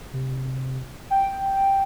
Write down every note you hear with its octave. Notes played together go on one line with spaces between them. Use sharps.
C3
G5